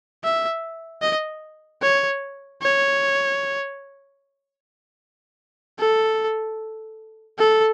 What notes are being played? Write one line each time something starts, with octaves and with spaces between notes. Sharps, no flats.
E5
D#5
C#5
C#5
A4
A4